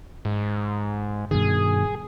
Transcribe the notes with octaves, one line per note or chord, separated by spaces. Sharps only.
G#2
G2 B2 D#3 G#4